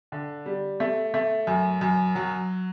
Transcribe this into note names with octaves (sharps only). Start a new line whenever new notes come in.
D3
G3
A3
A3
F#2
F#2
F#3